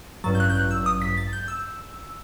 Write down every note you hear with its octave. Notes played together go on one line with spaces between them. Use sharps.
A1 G2 F#3 A6
G6
F#6
G6
F#6
E6
D#6
B6
A6
G6
E6